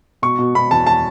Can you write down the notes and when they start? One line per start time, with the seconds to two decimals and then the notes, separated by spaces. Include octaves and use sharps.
0.22 B2 C#6
0.39 B2
0.55 B2 B5
0.71 E2 A5
0.87 A5